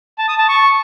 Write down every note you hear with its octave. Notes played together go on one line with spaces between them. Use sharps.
A5
D#6
A5
C#6